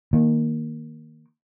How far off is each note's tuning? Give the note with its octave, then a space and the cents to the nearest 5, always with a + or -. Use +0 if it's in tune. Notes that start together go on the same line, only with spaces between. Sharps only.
D#3 +0 A#3 +0